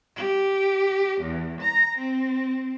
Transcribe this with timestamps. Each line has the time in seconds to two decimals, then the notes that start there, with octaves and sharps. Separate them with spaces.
0.15 G4
1.21 E2
1.61 A#5
1.98 C4